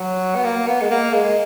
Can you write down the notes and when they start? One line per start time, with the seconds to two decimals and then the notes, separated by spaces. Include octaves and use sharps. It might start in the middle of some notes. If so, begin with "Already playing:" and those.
Already playing: F#3
0.35 B3
0.44 A#3
0.67 B3
0.81 G#3
0.91 A#3
1.14 G#3